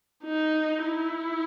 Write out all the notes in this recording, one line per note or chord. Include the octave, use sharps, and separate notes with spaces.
D#4
E4